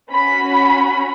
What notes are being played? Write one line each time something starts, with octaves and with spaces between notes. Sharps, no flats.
C#4 F#4 B5